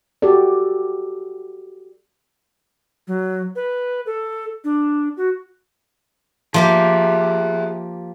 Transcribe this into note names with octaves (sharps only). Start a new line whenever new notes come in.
F#4 G4 A4 D5
F#3
B4
A4
D4
F#4
F3 A#3 G4 G#4 E5